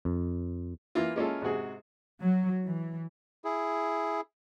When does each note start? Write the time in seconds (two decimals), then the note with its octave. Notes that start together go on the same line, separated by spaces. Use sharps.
0.05 F2
0.95 E3 A#3 E4 F4
1.16 G#3 A#3 C#4 E4 F4 A4
1.42 G#2 C3 F#4 G#4
2.20 F#3
2.64 E3
3.45 E4 G#4